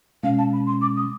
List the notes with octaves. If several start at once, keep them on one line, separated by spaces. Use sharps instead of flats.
B2 G#3 C#4 F5
A5
B5
C6
D6
D#6